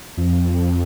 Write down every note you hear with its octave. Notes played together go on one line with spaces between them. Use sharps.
F2